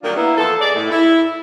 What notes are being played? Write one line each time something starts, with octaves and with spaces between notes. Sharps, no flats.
D#3 F#3 G3 A#3 D4 F4
A#3 B3 E4
E2 F3 B3 A4
G#4 D5 D#5
A2 A3
E4